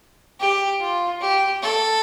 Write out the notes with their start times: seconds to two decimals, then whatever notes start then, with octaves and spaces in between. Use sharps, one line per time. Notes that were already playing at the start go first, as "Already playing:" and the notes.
0.40 G4
0.80 F4
1.21 G4
1.62 A4